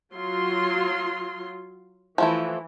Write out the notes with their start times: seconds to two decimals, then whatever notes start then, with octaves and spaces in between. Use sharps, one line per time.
0.12 F#3 F4 C6
2.18 E3 F3 A3 E4